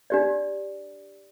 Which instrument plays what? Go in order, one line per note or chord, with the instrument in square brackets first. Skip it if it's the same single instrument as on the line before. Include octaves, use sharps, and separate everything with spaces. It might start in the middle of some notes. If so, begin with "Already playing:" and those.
[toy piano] D4 G4 D5